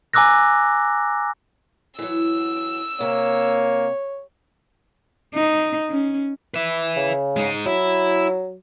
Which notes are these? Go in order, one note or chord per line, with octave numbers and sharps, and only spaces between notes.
G#5 A#5 D6 E6 F#6 A#6
E3 F#3 E6
C3 A#3 C#5
D#4
C#4
B4 E5
C#3
G#3 D#4
F#3 E4